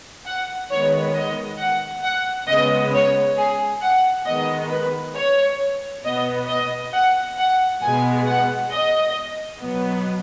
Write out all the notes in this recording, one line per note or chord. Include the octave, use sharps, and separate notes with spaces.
F#5
D#3 G#3 B3 C#5
D#5
F#5
F#5
C#3 G#3 B3 D#5
C#5
G#4
F#5
D#3 G#3 B3 D#5
B4
C#5
B2 B3 D#5
D#5
F#5
F#5
B2 G#3 B3 G#5
F#5
D#5
B2 F#3 B3